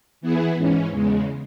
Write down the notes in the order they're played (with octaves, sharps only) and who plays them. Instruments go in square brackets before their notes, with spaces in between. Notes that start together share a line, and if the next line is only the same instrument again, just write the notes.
[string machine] E3 B3 E4 G#4
G#2 E3 C#4
E2 C#3 G#3